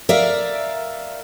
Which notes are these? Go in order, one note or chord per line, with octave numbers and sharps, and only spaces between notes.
A#4 D5 E5 F5